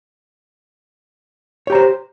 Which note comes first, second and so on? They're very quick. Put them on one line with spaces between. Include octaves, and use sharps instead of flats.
C#5 G4 A#5 C5